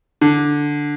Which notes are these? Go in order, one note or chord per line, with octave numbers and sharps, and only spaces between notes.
D3